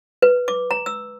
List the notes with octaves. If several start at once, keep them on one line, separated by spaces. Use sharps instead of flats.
B4
D6
A#5
E6